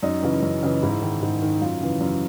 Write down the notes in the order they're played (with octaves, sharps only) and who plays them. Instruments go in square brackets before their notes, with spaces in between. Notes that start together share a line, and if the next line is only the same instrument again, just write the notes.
[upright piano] F#2 D#4
C#3 E3
F#2
C#3 E3
G#2 E4
D#3
G#2
D#3
F#2 F4
C#3 E3
F#2